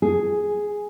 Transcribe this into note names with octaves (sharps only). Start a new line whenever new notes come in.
G#4